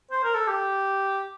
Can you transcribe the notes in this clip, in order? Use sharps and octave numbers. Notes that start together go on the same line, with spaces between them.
C5
A#4
A4
G4